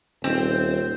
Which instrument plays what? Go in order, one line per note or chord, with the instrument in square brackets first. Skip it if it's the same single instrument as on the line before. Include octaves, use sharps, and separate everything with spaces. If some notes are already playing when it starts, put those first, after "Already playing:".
[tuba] D#1 [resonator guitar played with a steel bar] C4